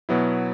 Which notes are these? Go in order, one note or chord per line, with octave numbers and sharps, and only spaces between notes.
B2 F#3 B3 E4